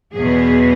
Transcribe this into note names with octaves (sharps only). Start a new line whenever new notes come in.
E2 B2 F#3 B3 G#4